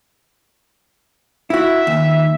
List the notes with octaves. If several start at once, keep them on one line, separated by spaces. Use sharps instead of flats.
E4 F#4 E5
D#2